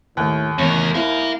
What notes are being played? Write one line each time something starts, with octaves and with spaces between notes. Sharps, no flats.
D#2 A2
E2 A#4 C#5
E4 A#4 F5